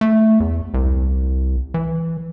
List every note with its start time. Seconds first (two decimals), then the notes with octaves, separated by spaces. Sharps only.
0.01 A3
0.40 E2
0.74 C2
1.74 E3